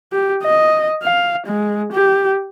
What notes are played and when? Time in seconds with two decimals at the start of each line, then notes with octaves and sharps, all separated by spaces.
0.12 G4
0.44 D#5
1.03 F5
1.47 G#3
1.92 G4